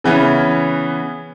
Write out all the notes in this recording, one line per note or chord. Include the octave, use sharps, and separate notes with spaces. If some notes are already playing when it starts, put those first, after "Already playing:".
C#3 E3 B3 C#4